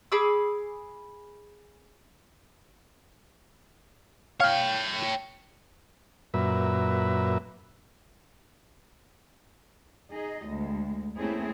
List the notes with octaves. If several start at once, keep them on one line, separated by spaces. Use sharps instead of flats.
G#4 B5 D6 E6
C#5 F5 G5
F#2 A#2 B4 E5
D#4 G#4 D#5
D2 G#3
A3 A#3 C4 C#4 E4 G#4